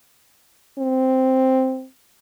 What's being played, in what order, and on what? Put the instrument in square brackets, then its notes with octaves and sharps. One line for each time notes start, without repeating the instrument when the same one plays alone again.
[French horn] C4